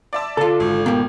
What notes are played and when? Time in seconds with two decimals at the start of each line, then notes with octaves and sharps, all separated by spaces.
0.13 D5 E5 A5
0.37 D3 F4 A4
0.60 G#1
0.86 B2 A#3 G4